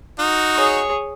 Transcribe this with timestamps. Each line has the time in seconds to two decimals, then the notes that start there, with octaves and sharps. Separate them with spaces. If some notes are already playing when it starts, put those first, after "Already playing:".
0.19 D#4 F#4
0.55 G#4 C#5